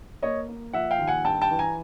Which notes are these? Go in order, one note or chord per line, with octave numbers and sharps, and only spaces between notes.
A#3 C#5 D#5
A#3
F3 E5 F#5
F5 G5
D#2
F#5 G#5
G2 G5 A5
G5 A5
E3
G#5 A#5